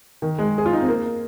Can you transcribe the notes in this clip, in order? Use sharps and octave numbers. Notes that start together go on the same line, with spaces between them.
D#3
G#3
G#4
F4
D#4
C4
A#3